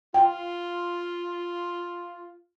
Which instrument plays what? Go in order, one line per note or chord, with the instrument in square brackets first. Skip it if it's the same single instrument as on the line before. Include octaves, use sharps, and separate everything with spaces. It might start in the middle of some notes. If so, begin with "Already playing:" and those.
[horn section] F4 [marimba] G5